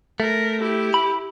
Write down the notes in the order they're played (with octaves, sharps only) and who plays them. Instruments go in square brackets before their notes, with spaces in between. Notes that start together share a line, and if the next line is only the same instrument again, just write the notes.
[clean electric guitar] A3 [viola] A#4
[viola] E4 G4
[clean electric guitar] B5